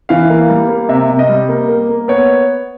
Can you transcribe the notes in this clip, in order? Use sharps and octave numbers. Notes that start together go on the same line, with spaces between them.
E3 F5
A#3 F5
G3
A#3
C3 E5
C3
D#5
G3
A#3
A#3
A#3
B3 C#5